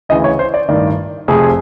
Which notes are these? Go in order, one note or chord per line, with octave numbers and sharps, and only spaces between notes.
D2 C#3 E3 D#5
C#5
C5
D5
A1 G2 D#3 D5
F1 F2 C3 G#4